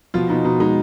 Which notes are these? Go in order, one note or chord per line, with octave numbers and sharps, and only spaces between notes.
B2 F3 F4
B2 D#4
B2 D#4
G#3 D#4